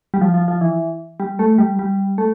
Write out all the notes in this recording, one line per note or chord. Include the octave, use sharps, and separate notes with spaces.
G3
F3
F3
F3
E3
G3
A3
G3
G3
A3